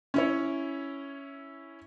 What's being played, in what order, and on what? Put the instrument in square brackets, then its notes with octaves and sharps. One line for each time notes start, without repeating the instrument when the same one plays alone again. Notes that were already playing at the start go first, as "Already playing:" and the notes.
[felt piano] C#4 E4 C#5